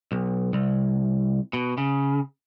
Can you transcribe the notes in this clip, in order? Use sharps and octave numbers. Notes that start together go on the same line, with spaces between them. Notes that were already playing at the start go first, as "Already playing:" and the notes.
B1
C2
B2
C#3